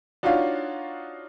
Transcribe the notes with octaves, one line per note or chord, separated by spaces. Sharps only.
D4 D#4 F4 F#4 C#5 F5